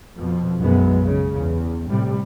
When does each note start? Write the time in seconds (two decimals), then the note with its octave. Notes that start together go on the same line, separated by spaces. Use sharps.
0.16 F2 B2 F3
0.59 B1 F#2 G#3 B3
1.03 C#3
1.36 E2
1.89 A2 C3 G3